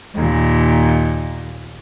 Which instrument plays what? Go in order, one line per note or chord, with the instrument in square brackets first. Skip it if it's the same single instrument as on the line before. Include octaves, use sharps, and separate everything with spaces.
[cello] D#2 A#2